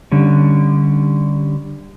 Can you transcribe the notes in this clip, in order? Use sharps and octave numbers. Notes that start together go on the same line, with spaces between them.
D3 G3 C#4